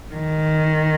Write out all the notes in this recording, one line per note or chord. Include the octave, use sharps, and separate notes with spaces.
D#3